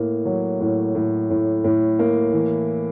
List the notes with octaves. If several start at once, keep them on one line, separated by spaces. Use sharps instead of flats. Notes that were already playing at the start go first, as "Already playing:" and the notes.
Already playing: A2 A#3
F#3
A2
A2
A2
A2
A#3
E3